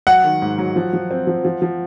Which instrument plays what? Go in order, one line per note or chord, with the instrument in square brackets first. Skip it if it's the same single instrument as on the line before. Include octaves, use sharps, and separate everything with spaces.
[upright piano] F#3 [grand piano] F#5
[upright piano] D#3
G#2
F#3
F3
F3
C4
F3
F3
F3